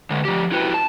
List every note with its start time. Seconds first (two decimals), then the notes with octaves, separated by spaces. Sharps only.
0.10 D3 G#3
0.25 F3 G4
0.52 E4 F#4 G4 B4
0.74 A5